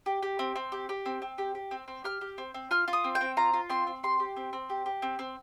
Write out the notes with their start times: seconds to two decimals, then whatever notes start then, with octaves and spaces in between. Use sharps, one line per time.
0.06 G4
0.22 G4
0.39 C4
0.56 C4
0.72 G4
0.89 G4
1.06 C4
1.22 C4
1.38 G4
1.55 G4
1.71 C4
1.88 C4
2.04 G4 F6
2.21 G4
2.38 C4
2.54 C4
2.71 F4 F6
2.88 F4
2.93 D#6
3.04 C4
3.15 G5
3.21 C4
3.37 F4 A#5
3.53 F4
3.69 C4 C6
3.87 C4
4.03 G4 C6
4.20 G4
4.36 C4
4.53 C4
4.70 G4
4.86 G4
5.02 C4
5.19 C4